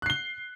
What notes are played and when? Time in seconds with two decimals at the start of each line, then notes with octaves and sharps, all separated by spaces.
0.02 F#6
0.06 C7
0.10 G7